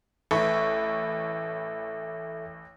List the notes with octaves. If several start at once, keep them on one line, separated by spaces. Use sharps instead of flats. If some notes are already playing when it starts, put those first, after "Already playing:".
A1 A4 B4 E5 C#6